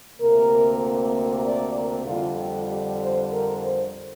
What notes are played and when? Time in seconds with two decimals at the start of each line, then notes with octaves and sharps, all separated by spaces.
0.19 D2 C3 A#3 A#4
1.44 D5
1.75 A#4
2.05 F2 D3 G3 F4
2.36 G4
2.67 G4
2.98 C5
3.30 A#4
3.60 C5